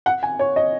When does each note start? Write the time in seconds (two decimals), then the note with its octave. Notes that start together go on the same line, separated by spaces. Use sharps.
0.06 F#5
0.23 G#5
0.39 C#5
0.56 D#5